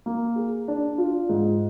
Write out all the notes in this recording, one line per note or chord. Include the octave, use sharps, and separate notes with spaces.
A#3
G#4
D4
F4
G#2